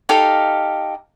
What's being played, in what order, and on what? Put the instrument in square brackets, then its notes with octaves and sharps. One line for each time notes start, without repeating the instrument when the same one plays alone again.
[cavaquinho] D#4 G4 A4 F5